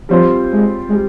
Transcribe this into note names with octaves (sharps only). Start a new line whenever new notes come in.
F3 G3 C4 F4 C5
G#3
G#3
G3